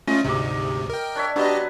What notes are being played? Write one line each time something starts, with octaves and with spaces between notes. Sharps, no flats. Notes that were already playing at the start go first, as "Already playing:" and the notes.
A3 C#4 F4 D#5
D2 G#2 C3 D#5 D6
A#4 G5
D4 C#5 E5
F#3 B3 D4 G4 B4 D#5